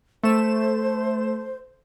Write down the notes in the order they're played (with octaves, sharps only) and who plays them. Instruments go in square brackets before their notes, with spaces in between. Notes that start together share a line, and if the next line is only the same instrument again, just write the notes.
[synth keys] A3 E7 [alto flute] C5